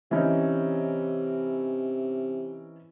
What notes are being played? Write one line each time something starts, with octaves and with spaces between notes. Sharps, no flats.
C3 E3 C#4 D#4